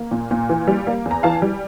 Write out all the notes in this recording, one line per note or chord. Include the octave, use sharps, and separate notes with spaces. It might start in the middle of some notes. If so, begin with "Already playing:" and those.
Already playing: A#3
A#2
A#2
E3
G3
A#3
E2
A#5
E3 F5 A5
G3